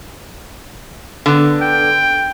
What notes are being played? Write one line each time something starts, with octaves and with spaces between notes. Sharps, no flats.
D3 B3
G5